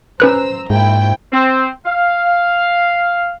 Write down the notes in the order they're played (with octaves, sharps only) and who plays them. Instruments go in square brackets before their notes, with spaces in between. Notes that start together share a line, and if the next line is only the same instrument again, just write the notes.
[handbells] C#4 B4 F#6 [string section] C5 A#5 E6
[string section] A#1 E4 G5 [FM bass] G#2
[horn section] C4
F5